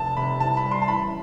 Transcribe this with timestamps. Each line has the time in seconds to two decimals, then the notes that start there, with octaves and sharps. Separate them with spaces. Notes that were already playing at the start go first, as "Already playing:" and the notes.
Already playing: F1 A5
0.17 C3 B5
0.40 C2 A5
0.57 B5
0.64 G3
0.71 C6
0.82 A5
0.87 A1 B5